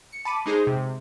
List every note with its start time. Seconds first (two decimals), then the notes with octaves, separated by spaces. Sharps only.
0.12 C#7
0.25 A5 B5 D6 D#7
0.46 G#3 D#4 G#4 C5
0.67 C3